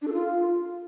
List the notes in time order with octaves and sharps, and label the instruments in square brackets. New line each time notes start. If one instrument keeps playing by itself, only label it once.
[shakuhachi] D4
A4
F4